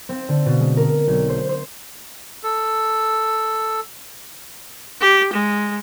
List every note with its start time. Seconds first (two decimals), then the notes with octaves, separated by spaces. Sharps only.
0.09 C4
0.29 D3
0.46 B2
0.60 G#3
0.77 A#4
1.07 B1
1.29 C5
1.49 C5
2.43 A4
5.01 G4
5.33 G#3